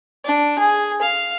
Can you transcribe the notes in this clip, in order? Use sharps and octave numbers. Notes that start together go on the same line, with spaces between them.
D4
G#4
F5